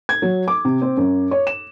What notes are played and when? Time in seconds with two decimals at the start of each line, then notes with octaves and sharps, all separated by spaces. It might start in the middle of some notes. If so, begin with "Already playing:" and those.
0.09 G#6
0.22 F#3
0.48 D6
0.65 C3
0.82 C4
0.97 F#2
1.31 C#5
1.47 E7